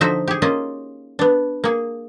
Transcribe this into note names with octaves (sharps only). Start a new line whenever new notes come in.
D3 F3 D#4 F#4 C5 E5
G4 G#4
A#3 C#4 F4 D#5
B3 D4
A#3 G#4